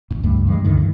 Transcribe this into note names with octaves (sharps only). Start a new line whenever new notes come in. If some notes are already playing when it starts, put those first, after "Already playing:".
A1 G#2
C#2 G2 A3
G2 E3 G#3
C#2 G2 D3 D#3
E3